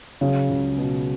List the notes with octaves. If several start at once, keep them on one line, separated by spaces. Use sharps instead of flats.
C#3 F#3
C#2
B2